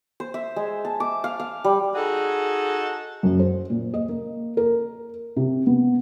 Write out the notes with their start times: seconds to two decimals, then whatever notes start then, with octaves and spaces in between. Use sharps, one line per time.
0.20 C5
0.34 E5
0.56 G#3
0.85 A5
1.00 D6
1.24 F5
1.40 F5
1.64 G3
1.95 D#4 F#4 G#4 A4
3.23 F#2
3.40 C5
3.70 A#2
3.94 D#5
4.09 A#3
4.57 A#4
5.37 C3
5.67 B3